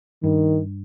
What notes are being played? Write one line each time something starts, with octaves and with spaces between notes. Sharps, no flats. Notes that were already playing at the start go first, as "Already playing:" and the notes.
G2 D#3